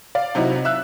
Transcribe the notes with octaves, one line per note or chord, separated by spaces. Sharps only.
D5 F5
C3 F#3 D#4 E4 F#4
E5 E6 F#6